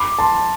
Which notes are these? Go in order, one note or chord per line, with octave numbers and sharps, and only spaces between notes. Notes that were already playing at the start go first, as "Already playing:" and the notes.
Already playing: B5 D6
A5 C6